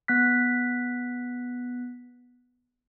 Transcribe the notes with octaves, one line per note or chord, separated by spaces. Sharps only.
B3 F#6 B6